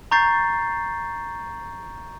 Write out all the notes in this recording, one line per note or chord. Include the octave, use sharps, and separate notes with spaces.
A#5 C#6 G6 A6 C7